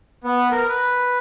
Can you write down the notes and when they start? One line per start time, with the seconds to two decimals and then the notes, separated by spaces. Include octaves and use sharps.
0.24 B3
0.51 A#4
0.68 B4